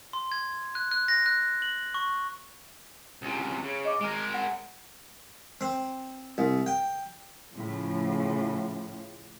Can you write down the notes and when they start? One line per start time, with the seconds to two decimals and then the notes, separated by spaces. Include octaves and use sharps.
0.13 C6
0.32 G#6
0.75 F#6
0.91 F#6
1.08 A#6
1.26 F#6
1.62 F#7
1.94 C#6
3.22 C#2 C3
3.64 C#3
3.85 D#5 D6
4.01 G#3 A#4 D7
4.34 F#5
5.61 C4
6.38 C2
6.66 G5
7.54 A2 C#3 F3